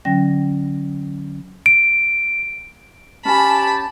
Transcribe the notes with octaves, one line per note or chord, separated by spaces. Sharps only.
D3 F#3 C#4 G5 A#6
D7
C#4 G4 G#5 A5 B5